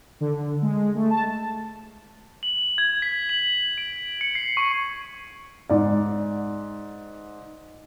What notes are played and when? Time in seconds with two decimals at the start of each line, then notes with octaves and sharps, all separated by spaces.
0.21 D3
0.62 G#3
0.95 A3
1.10 A5
2.43 F#7
2.78 G#6
3.02 B6
3.29 F#7
3.78 D7
4.21 C#7
4.35 C7
4.57 C#6
5.69 G#2 D5